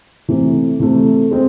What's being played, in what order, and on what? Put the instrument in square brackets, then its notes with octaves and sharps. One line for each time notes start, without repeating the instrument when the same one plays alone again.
[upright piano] C3 E3 A3
C3 E3 A3
G#3 C4